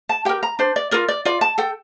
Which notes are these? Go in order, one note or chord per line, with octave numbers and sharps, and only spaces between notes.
A5
G4 A#4 G5
A#5
D4 C5
D5
F4 A#4 D5
D5
F4 D5
A5
A4 G5